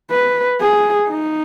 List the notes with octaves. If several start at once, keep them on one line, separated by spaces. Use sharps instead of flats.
B4
G#4
D#4